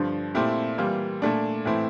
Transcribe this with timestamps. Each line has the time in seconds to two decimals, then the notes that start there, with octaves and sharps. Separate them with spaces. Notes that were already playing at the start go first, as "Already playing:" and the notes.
Already playing: G2 D3 F3
0.35 A#2 A3 C4 E4 G4
0.78 E3 G3 A#3 F4
1.22 A#2 A3 D4
1.65 A2 E3 A3 C4 E4